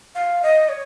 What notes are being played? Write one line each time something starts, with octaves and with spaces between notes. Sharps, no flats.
F5
D#5
C#5